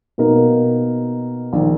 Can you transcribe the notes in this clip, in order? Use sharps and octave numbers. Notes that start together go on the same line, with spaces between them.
B2 A#3 D#4 A#4
A#1 D#3